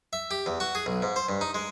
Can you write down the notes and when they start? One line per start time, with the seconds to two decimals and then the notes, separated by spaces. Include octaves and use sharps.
0.13 E5
0.31 G4
0.46 E2
0.60 F#4
0.75 G#4
0.86 B1
1.02 G#2
1.16 C5
1.29 G2
1.41 D#4
1.54 G#3